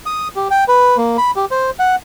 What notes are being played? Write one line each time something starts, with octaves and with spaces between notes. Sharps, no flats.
D#6
G4
G5
B4
A#3
B5
G4
C5
F#5